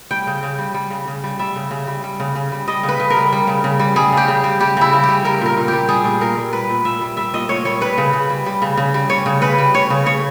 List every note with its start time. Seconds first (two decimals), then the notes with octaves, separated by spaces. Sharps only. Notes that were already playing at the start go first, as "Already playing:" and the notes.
0.11 G3 G5
0.27 C#3
0.43 C#3
0.58 G3
0.74 G3
0.90 C#3
1.07 C#3
1.24 G3
1.39 G3 E5
1.56 C#3
1.71 C#3
1.87 G3
2.04 G3
2.20 C#3
2.35 C#3
2.52 G3
2.67 G3 D#5
2.83 C#3
2.89 B4
3.00 C#3
3.10 A#4
3.16 G3
3.32 G3
3.47 C#3
3.64 C#3
3.79 G3
3.96 G3 G#4
4.12 C#3
4.17 G4
4.28 C#3
4.44 G3
4.60 G3 G4
4.77 C#3 E4
4.93 C#3
5.03 G4
5.09 G3
5.24 G3 A#4
5.41 A#2 A#4
5.57 A#2
5.68 G3 G4
5.89 G3 G#4
6.05 A#2
6.21 A#2 A#4
6.37 G3
6.52 G3 B4
6.70 A#2
6.85 A#2 E5
7.01 G3
7.17 G3 E5
7.34 A#2 D#5
7.49 A#2 C#5
7.65 G3 C#5
7.81 G3 B4
7.98 C#3
8.13 C#3
8.30 G3
8.46 G3
8.62 C#3
8.77 C#3
8.94 G3
9.10 G3 C#5
9.26 C#3
9.42 C#3 B4
9.58 G3
9.74 G3 C#5
9.90 C#3
10.06 C#3 C#5